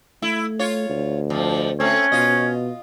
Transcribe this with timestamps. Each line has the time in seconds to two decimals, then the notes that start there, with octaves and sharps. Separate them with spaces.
0.22 A3 E4
0.59 F4 C#5
0.89 D2
1.30 F2 F3
1.80 A3 C4 C#4
2.12 B2 F4 D#5